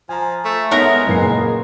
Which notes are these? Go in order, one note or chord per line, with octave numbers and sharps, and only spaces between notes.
F3 G#5 A#5
A3
G#3 B3 D#4 A#4 C#5 E5 A#5
F#1 A#2 B4 C7